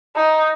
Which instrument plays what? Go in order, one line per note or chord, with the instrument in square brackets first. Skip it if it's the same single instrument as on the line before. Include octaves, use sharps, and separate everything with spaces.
[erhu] D#4